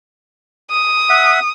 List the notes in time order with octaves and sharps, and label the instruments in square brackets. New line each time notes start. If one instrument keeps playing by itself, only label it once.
[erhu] D#6
[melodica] E5 F#5